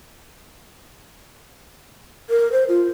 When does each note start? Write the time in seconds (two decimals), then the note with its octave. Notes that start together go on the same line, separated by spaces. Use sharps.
2.30 A#4
2.52 C5
2.69 F4